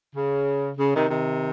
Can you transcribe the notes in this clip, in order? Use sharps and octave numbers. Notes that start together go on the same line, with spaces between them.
C#3
C#3
C3 D#3
C3 D#3